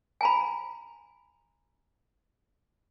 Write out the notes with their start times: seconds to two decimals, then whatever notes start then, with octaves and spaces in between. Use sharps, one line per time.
0.21 G#5 A#5 B5